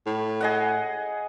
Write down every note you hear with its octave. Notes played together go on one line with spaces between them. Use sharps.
A2
G#4 D#5 F#5